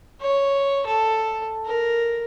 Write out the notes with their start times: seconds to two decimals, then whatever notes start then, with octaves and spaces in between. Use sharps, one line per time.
0.21 C#5
0.86 A4
1.66 A#4